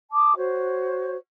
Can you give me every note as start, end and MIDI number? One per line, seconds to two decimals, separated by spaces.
0.12 0.33 81
0.12 0.33 86
0.12 0.33 87
0.36 1.16 66
0.36 1.16 72
0.36 1.16 73